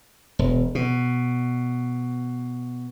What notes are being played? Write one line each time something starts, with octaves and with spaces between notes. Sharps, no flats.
E1
B2